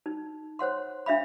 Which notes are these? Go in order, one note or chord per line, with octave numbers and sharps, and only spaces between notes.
D#4
C5 C#5 F#5 C6
D4 E5 F5 B5